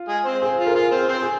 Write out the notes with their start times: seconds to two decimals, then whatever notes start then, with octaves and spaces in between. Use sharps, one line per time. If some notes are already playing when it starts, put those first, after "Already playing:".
Already playing: F4
0.08 G#3 G#4
0.25 C4 C5
0.42 C4 G#4 C5
0.59 F4
0.66 A#4
0.75 F4 G#4
0.92 C4 C5
1.09 C4 C5
1.22 G#4